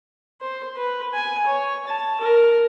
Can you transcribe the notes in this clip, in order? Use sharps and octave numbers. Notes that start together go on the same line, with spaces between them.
C5
B4
G#5
C#5
A5
A#4